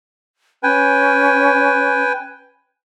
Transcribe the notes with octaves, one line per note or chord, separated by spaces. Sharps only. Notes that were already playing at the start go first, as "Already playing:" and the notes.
C#4 B4 G5 G#5